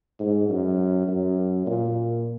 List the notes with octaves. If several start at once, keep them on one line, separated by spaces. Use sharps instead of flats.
G#2
F#2
F#2
A#2